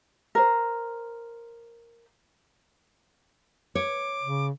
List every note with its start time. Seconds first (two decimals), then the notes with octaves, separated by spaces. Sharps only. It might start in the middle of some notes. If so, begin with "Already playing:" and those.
0.35 A#4 C5
3.75 C#5 D6
4.23 C#3